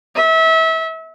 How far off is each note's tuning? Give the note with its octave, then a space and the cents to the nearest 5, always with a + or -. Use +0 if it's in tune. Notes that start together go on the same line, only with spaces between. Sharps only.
E5 -30